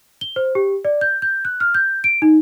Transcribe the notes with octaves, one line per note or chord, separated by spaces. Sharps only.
G7
C5
G4
D5
G6
G6
F#6
F6
G6
D7
D#4